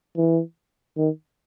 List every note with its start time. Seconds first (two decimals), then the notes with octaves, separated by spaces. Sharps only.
0.17 E3
0.97 D#3